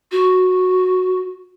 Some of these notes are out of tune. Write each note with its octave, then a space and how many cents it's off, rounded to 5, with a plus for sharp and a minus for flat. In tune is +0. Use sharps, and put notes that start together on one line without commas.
F#4 -5